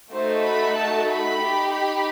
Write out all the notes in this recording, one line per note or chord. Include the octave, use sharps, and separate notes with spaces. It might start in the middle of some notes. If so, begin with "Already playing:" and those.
A3 D#4 F#4 A4 C5
B5
A5
B5
D#4 G4
B5